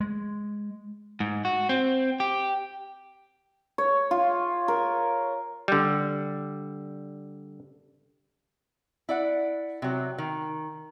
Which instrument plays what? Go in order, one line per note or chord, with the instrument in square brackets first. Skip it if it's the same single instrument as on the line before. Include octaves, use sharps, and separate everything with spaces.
[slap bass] G#3
[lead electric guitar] G#2
F#4
C4
G4
[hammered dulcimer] C#5
F4
A#4
[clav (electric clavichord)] D3 G3
[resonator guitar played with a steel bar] E4 D5 F#5
C3 F#3
D#3